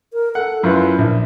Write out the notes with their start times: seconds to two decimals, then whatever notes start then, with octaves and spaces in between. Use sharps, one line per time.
0.13 A#4
0.35 A4 F#5
0.63 F#2 E4 F4 B4
0.98 A#1